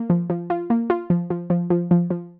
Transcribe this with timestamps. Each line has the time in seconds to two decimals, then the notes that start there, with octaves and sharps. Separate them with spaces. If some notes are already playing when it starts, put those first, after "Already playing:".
Already playing: A#3
0.10 F3
0.30 F3
0.50 F4
0.70 A#3
0.90 F4
1.10 F3
1.30 F3
1.50 F3
1.70 F3
1.91 F3
2.10 F3